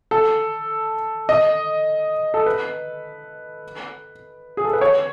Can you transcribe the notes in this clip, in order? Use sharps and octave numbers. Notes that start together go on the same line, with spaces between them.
A4
D#5
A4
B4
G#4
A4
B4
C#5